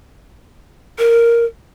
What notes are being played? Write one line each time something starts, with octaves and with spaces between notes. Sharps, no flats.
A#4